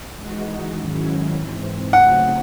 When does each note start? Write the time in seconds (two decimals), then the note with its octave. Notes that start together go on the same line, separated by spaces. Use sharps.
0.16 E3 G#3 D#4 F#4
0.75 G#2 D#3 F#3 C#4 E4
1.34 G#2 E3 C4
1.93 C#3 F#3 A3 C4 D#4 F#5